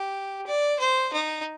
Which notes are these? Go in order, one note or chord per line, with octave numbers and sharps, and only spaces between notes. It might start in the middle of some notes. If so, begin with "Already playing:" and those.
Already playing: G4
D5
C5
D#4